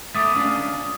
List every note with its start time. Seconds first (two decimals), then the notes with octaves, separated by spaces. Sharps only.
0.15 A3 B3 E5 D6 D#6 A6
0.36 C#4 D4 F4 D#6